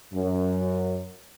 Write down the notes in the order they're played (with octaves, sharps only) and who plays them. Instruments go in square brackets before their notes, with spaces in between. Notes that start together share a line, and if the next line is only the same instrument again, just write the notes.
[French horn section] F#2